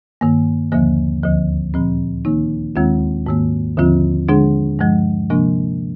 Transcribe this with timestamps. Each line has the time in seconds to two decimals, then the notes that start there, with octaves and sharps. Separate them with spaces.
0.21 G2 D#3 A#3
0.72 D#2 D3 F3 A#3
1.23 D2 D3 F3
1.74 A#2 F3 C4
2.25 D#3 A#3 D#4
2.76 D#2 D#3 G#3 C4 F4
3.26 G#2 D#3 A#3
3.77 D#2 D3 F3 C4 F4
4.29 D3 G#3 D4 G#4
4.79 G2 F3 G#3
5.30 C3 F3 A#3 D4